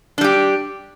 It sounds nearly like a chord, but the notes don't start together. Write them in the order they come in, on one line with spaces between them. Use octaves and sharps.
D4 G3 G4